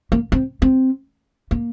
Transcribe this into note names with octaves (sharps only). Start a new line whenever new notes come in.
A#3
C4
C4
A#3